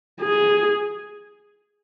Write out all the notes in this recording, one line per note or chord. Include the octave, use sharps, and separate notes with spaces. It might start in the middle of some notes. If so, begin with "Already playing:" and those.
G#4